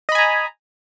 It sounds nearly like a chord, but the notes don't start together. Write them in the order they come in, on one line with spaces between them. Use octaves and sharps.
D#5 B5 G#5 A#5